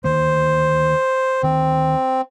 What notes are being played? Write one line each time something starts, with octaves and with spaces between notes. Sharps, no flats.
D2 D#3 A#3 C5
D2 D#3 C4